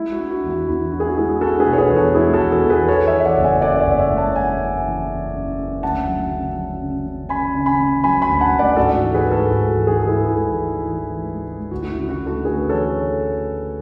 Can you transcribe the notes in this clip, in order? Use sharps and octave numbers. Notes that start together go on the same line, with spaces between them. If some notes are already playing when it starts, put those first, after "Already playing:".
Already playing: G#3 E4
F#4
D4
F#4
E2
F#4
E2 E4
D4 F#4
G#4
F#4
G#3 E4 G#4
D4 F#4 A4
G#4 B4
B2
C#5
G#4 B4
E2
F#4 A4
G#3 E4 G#4
F#4 A4
E2
F#4 A4
E2
G#4 B4
E3 A4 C#5
C#5 E5
E3
E5
D5 F#5
F#1
E5 G#5
F#2 D5 F#5
C#5 E5
F#1
C#5 E5
G#3
F#5 A5
G#3 E5 G#5
F#2
E3
F#2
F#2
F#2
D2 F#5 A5
F#3
C#3
F#3
C#3
C#3
C#3 G#5 B5
C#3
G#5 B5
C#3
F#3 G#5 B5
G#5 B5
D2
F#5 A5
D2
D5 F#5
G#2 F#4 A4
E3
G#4 B4
G#2
F#4 A4
G#2 F#4
E3
G#4
G#2 A4
E4 G#4
G#2 E4
E3
E3
E3
G#3
G#3
D2 F#4
F#4
E4
C#3
F#4
D2
F#4 A4
D2 G#4 B4
E3 A4 C#5